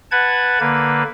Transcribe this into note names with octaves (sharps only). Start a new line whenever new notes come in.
B4 F#5 A5 G#6
D3 A#3 B4